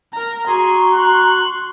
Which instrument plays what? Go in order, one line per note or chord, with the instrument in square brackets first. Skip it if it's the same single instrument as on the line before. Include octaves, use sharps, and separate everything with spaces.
[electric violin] A#4 A#5
[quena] F#4 [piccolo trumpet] G#4 [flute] A#5 [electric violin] C6 C#6
[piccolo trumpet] F#6